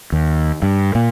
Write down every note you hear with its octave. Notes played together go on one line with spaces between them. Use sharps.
D#2
G2
A#2